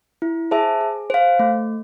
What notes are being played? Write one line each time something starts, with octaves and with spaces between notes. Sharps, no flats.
E4
G#4 C5 E5 A5
G#4
C5 F5
A3